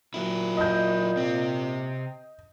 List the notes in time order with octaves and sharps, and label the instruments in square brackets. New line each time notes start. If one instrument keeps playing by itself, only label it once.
[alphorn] A#2 [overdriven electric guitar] F#3 E4
[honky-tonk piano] D#5 G6
[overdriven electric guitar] C3 C4